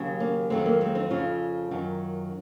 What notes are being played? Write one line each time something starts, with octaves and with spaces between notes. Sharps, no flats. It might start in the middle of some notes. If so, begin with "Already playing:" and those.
Already playing: D#2 C#3 F#3
A#3 C#4
F2 D#3 F#3 G#3 C4
A#3
G#3 C4
C4 D#4
F2 C#3 F3 C#4 F4
F#2 D#3 F#3